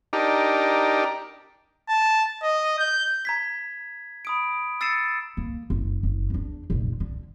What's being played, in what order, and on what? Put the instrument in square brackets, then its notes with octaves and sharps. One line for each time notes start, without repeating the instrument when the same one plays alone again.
[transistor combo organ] D4 D#4 G4 A#4
[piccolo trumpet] A5
D#5
G6
[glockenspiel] A#5 G#6 B6
B5 D#6 D7
E6 A6 C7 C#7 D#7 E7
[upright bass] A#3
F#1
F#1
E2 D4
F1 A#1
D3